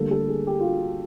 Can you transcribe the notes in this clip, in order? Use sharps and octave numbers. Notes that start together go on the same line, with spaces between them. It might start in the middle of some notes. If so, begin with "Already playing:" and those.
Already playing: D2 D3 G3 A#3 A4
A4
G#4
G4
F4
F#4